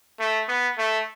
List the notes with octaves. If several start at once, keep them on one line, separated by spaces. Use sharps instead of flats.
A3
B3
A3